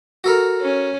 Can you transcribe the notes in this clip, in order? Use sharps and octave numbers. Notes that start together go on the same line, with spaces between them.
F#4 A4 A#4
C#4